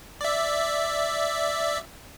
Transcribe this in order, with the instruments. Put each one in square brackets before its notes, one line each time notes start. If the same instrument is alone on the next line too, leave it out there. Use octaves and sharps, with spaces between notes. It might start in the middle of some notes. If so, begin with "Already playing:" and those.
[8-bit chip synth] D5 E5